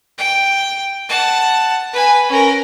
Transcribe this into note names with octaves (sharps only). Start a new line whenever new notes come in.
G5
F#5 A5
B4 G#5
C#4 A#4